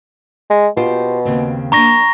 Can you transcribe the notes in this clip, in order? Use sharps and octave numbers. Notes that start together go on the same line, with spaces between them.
G#3
B2 F4 G4 C5
D#2 C#3 C4
A#3 D4 A#5 C#6 A#6